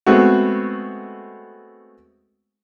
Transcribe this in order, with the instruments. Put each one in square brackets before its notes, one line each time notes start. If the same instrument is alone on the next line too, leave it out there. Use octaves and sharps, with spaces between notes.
[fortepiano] G#3 A3 B3 C4 F#4